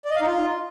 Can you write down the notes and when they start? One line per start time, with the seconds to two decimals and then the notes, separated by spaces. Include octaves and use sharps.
0.05 D5
0.10 D#5
0.16 F5
0.21 D#4
0.27 F4